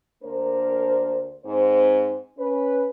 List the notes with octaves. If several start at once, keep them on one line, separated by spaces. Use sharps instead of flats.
D2 A#3 D4 A#4 C5
G#2 C4 C5
C#4 B4